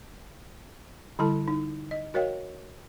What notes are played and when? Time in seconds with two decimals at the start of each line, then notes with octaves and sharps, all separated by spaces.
1.19 D3 G3 E4 A4 A5
1.48 D#4
1.91 D#5
2.14 F#4 A#4 C#5 D#5 F5 G5